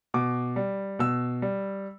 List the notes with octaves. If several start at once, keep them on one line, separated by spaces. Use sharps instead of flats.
B2 D6
G3
B2 E6
G3